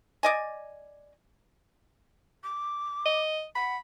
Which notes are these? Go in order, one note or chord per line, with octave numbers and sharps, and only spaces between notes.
D5 D#5 G#5
D6
D#5
F#5 B5